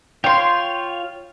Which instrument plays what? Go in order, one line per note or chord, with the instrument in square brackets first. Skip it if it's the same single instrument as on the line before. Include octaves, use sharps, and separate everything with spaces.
[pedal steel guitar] F4 C#5 [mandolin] G5 C6